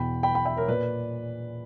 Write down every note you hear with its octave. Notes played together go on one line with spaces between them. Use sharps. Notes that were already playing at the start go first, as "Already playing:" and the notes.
Already playing: E2 B2 G5 B5
G5 B5
G5 B5
E5 G5
A#4 C#5
A#2 B4 D5